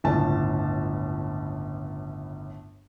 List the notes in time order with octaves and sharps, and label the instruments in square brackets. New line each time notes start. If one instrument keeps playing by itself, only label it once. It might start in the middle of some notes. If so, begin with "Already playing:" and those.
[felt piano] G1 C#2 A2 A5